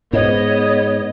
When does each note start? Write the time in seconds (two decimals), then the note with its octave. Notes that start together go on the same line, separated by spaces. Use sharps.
0.13 G#2 B3 C#5 D#5